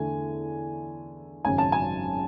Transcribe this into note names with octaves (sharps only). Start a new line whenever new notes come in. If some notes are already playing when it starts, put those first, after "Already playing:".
Already playing: E2 D3 A3 G#5
G#1 F#2 C#3 F#3 G#5
A5
G#5